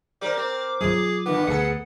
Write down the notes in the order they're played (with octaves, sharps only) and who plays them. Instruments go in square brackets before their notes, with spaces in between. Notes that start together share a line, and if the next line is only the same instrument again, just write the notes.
[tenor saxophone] G3 [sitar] A#4 C5 [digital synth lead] D6
[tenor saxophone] C4
[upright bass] F#3 F4 [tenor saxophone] G#4
[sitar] G2 D3 [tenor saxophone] B3
[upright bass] D2 [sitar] G#4 A4 [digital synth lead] F#5